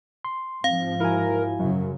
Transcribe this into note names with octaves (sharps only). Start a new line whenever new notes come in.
C6
G#2 F3 C4 F5
E4 F#4 A#4 G#5
F#2 C#3 F#3